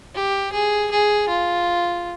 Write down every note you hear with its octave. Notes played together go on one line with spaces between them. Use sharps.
G4
G#4
G#4
F4